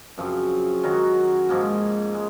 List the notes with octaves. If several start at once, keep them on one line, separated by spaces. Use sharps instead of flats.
F#2 C#3 F3 C4
D#3 F#3 C#4 F#4
G#2 F3 A#3
G#3